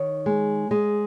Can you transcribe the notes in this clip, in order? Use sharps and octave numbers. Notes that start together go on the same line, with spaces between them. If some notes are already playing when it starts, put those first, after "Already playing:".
Already playing: D#3 C#5
G#3
G#3